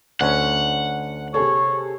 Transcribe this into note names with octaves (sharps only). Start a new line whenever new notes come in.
D2 C#4 F#5
C3 G#4 A4 C#5